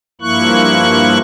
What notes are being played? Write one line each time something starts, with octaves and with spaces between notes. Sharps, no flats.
G2 F3 A#3 E4 C#6 F#6